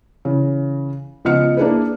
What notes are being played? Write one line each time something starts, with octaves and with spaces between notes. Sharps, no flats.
C#3 E3
C#2 F3 B3 D#5 F6 C#7
A#3 D4 E4 G#4 B4